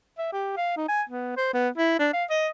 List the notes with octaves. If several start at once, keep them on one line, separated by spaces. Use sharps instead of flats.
E5
G4
F5
D#4
G#5
B3
C5
B3
E4
D4
F5
D#5